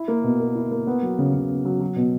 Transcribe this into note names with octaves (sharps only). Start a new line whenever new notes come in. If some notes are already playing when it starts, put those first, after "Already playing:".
Already playing: E4
A#3
B2
A#4
E4
A#3
B3
F#3
C#3
C#3
B3
F#3
F#3
B2